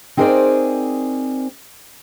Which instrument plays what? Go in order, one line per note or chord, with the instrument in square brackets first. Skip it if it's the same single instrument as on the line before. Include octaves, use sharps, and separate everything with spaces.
[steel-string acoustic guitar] C4 D#4 G#4 A#4 C5 D5